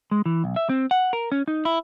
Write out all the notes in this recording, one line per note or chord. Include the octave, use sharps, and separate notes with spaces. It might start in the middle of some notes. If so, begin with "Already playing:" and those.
G#3
E3
B1
E5
C4
F#5
A#4
C#4
D#4
E4